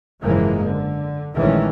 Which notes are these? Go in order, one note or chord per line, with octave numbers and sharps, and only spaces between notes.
F#1 G#2 E3 F3 G#3 A#3
D3
A#1 D#3 E3 G#3 A3 C#4